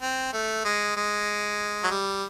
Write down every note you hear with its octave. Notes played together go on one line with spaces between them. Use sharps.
C4
A3
G#3
G#3
F#3
G3